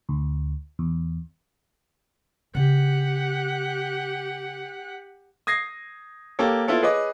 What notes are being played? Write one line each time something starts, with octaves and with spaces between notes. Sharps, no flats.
D2
E2
C#3 C4 G4 F#5
D#6 G#6 A#6 C7
A#3 G4 A4 C#5
B3 E4 F4 A4 C#5
G#4 B4 C#5 D#5 D6